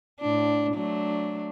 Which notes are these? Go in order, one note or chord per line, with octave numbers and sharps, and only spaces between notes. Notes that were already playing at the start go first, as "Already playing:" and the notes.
A2 D4
F#3 A3 D4